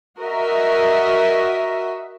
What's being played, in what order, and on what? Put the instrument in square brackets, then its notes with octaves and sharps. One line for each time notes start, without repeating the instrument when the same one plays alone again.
[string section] F#4 A#4 D#5 E5